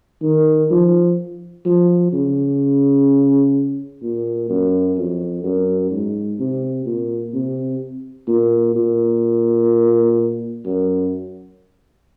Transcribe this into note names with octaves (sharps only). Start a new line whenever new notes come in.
D#3
F3
F3
C#3
A#2
F#2
F2
F#2
G#2
C3
A#2
C3
A#2
A#2
F#2